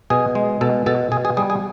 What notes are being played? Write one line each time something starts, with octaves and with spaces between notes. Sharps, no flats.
B2 G#4 G#5
G#3
B2 A4 A5
B2 A4 A5
B2 G#4 G#5
G#4 G#5
G3 G#4 G#5
G#4 G#5